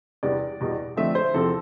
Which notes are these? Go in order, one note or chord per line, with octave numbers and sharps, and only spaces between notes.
E2 C3 G3 B3 D5
E2 B2 G3
D3 F3 A3 C4 E5
C5
E2 C3 F3 C4 A4